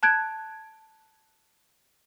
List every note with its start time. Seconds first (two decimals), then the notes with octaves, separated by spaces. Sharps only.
0.03 A5 F#6 G#6 D7